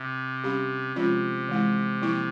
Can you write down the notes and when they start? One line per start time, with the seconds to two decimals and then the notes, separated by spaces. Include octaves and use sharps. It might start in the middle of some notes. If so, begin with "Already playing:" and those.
Already playing: C3
0.44 G3 C#4 G4
0.96 C3 F3 G#3 C#4 F4
1.49 E3 G#3 E4
2.02 F3 A#3 E4